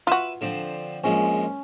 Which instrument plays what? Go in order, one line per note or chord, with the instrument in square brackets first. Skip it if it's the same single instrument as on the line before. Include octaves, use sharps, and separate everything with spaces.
[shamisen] F4 F#4 [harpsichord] B4 E5
[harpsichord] D3 F3 C4
[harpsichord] A#1 F3 G#3 [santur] C#4